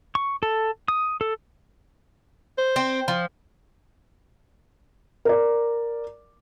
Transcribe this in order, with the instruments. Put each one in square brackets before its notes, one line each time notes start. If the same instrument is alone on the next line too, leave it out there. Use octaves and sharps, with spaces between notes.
[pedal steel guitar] C#6
A4
D#6
A4
[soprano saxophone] C5
[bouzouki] C4
F3
[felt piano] A#4 D5